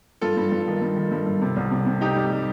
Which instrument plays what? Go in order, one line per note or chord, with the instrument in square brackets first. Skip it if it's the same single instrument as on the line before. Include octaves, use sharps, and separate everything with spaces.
[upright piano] G2 [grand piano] F4 A4
[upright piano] G2
G2
D#3
G2
D#3
G2
G2
C3
C2
C3
C3
[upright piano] C3 [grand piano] D#4 G4
[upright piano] G3
G3